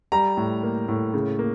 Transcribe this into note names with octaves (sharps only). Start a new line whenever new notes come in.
G3 A#5
A2
A#3
A2
C#3
A#3